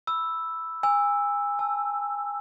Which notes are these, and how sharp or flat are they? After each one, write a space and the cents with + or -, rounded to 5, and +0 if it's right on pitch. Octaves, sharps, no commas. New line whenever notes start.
B5 +0 E6 +0
G#5 -30 E6 +0
A5 -30 E6 +15